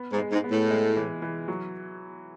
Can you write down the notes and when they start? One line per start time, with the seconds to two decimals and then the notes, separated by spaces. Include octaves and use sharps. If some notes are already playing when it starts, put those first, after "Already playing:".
Already playing: B3
0.12 G#2
0.18 G#3
0.31 G#2
0.44 B3
0.51 A2
0.71 G#3
0.97 E3
1.22 E3
1.48 F#3